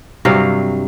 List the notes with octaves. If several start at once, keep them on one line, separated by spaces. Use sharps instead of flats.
G2 C3 F#3 F5